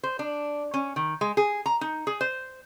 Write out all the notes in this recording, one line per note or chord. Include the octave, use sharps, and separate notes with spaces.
C5
D4
C#4
D#3
G#3
G#4
A#5
D#4
G#4
C5